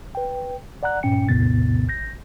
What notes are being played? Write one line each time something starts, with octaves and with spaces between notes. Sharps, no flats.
B4 G5
D5 F#5 A#5 F#6
G2 A#2 C#4 G5 C#7
A#1 E2 A2 C3 B3 A6
A1 G6 A#6